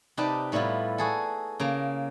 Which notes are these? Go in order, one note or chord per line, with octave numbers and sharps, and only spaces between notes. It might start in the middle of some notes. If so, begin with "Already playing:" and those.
C3 D#4 G4 B4 D5 A5
A2 G3 B3 E4 F4
F#4 G#4 A4
C#3 A#3 A#5